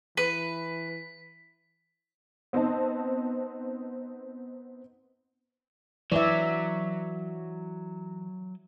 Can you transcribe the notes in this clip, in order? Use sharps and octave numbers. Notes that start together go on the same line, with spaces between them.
E3 B4 B6
B3 C4 D#4 D#5 A5
E3 F#3 E4 B4 D5 E5